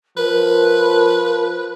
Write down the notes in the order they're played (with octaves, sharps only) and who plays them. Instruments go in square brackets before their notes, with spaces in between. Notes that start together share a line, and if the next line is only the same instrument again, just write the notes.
[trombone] F3 [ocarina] A#4 [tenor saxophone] B4